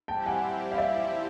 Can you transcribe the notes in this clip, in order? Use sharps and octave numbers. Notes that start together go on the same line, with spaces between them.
G3 C4 E4 G4 G5 A5
F#5 G#5
F5
D5 E5